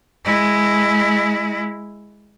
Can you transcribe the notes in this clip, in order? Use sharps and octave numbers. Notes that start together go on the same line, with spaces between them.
G#3 E4